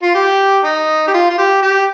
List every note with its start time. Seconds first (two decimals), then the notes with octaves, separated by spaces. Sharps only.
0.03 F4
0.15 G4
0.64 D#4
1.08 G4
1.14 F4
1.30 F4
1.38 G4
1.63 G4